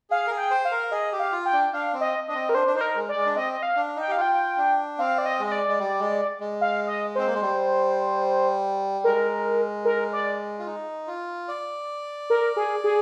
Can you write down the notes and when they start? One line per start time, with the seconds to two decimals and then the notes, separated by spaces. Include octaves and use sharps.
0.10 G#4 F5
0.27 A#4
0.31 G#4
0.37 G5
0.51 C5
0.65 F5
0.72 A#4
0.91 G#4 D#5
1.12 G4
1.19 F5
1.32 F4
1.45 G5
1.53 D4
1.73 D4 F5
1.93 C4
2.01 D#5
2.28 D4 D#5
2.34 C4
2.49 A#4
2.54 D4 C5
2.67 D4
2.75 D#4 C5
2.81 A#4
2.95 G#3
3.09 D5
3.15 G#3
3.26 D4
3.35 C4 D#5
3.53 D#5
3.63 F5
3.76 D4
3.96 D#4 G5
4.08 G4
4.12 F5
4.17 F4 G5
4.57 D4
4.98 C4 F5
5.18 D5
5.26 D#5
5.39 G#3
5.47 D#5
5.52 D5
5.68 G#3
5.79 G3
6.00 G#3
6.40 G#3
6.61 F5
6.87 D#5
7.15 C4 C5
7.26 A#3
7.34 G#3
7.42 G3
9.04 G#3 A#4
9.85 A#4
10.13 D5
10.59 F4
10.66 D#4
11.08 F4
11.48 D5
12.30 A#4
12.56 G#4
12.84 G#4